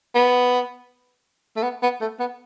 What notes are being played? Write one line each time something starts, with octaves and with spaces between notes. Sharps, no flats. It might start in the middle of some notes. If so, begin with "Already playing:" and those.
B3
A3
B3
B3
A3
B3